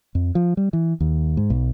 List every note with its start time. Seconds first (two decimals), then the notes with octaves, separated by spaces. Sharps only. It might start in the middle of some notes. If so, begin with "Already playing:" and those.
0.15 F2
0.35 F3
0.57 G3
0.73 E3
1.00 D#2
1.37 G#2
1.50 B1